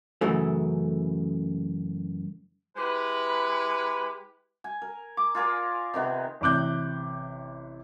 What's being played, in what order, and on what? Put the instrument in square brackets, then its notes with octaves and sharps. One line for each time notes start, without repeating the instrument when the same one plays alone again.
[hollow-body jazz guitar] F#2 C#3 E3 A3
[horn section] G#3 E4 G4 B4
[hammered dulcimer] G#5
A#4
D6
F4 G#4 A#4 D5
C3 D#3 B3
[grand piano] A1 C3 D6 F#6 G6